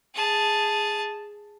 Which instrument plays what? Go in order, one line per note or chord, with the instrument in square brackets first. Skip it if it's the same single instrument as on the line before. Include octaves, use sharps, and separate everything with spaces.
[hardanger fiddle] G#4 A5